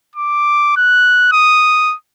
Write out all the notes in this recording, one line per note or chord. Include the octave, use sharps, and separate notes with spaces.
D6
F#6
D#6